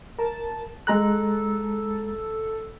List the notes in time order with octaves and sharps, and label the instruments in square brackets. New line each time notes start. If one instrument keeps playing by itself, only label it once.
[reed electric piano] A#4 [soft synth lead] A5
[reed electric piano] G#3 A#5 F#6 [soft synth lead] A4